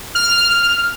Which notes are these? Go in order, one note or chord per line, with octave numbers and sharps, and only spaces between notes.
F6